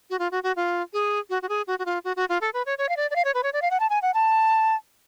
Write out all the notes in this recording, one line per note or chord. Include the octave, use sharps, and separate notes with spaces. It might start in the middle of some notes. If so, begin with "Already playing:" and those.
F#4
F4
F#4
F#4
F4
G#4
F#4
F#4
G#4
F#4
F#4
F4
F#4
F#4
F4
A4
B4
C#5
C#5
F5
D5
D5
F5
C#5
B4
C#5
D5
F5
F#5
A5
G#5
F#5
A5